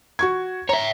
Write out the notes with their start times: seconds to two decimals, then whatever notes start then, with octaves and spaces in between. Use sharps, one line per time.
0.19 F#4 C#6 G#6
0.69 C#5 E5 A#5